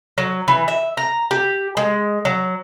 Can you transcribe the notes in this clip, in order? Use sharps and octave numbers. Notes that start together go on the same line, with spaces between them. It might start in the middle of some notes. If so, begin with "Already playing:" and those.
F#3
E3
E5
A#5
G4
G#3
F#3